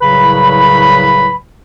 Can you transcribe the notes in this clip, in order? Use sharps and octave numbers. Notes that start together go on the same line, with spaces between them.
C2 A2 C#3 F#3 B4 B5